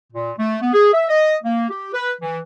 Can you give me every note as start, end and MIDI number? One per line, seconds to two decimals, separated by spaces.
0.13 0.33 46
0.38 0.57 57
0.62 0.72 59
0.73 0.92 68
0.94 1.05 76
1.09 1.35 75
1.44 1.69 58
1.70 1.89 67
1.93 2.13 71
2.22 2.39 52